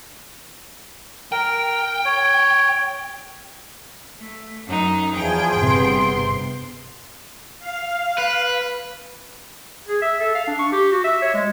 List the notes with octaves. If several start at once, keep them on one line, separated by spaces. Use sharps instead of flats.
A#4 G5
C#5
A3
F#2 D#4
E2 F3 G#4 G5 G#5
G1 C3 B3 C6
F5
B4
G#4
E5
A4
F5
D4
C#6
G4
F#4
E5
C#5
G#3